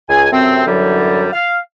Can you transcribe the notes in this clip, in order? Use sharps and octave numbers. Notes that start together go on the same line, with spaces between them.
C#2 G#5
F#2 C3 A3 C4
F#2 D3 E3 F#3 G3
F5